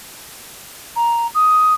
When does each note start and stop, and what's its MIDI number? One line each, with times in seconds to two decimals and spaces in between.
0.96 1.27 82
1.34 1.74 87